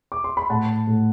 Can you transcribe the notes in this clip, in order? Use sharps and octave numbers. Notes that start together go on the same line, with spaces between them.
D6
C6
B5
A2 F#5 A5
A2